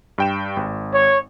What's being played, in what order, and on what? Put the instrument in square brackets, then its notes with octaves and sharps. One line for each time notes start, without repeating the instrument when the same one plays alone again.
[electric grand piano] G2 G5 E7
G#1
[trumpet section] C#5